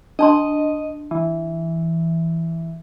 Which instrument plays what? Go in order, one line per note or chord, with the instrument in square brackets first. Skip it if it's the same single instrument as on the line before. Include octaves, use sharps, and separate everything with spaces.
[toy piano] D4 A5 C6 [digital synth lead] D#5
[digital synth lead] E3